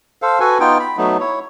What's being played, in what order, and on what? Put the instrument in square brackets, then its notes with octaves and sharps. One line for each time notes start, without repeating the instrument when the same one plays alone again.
[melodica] A4 C5 F5
F#4 A4 B4 G#5
B3 D#4 F4 G5
B5
F#3 A3 B3 D#4
E4 C#5